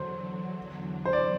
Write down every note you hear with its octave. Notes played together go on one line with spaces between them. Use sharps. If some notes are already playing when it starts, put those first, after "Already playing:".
Already playing: E2 D3 F#3 C5
C5
D5